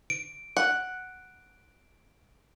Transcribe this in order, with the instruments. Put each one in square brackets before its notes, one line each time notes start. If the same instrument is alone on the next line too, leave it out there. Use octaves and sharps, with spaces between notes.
[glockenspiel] D7
[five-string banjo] F#5